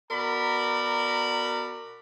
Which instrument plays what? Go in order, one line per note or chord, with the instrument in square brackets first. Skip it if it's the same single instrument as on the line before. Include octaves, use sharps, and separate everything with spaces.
[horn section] B2 F#4 A#4 D5 A#5 B5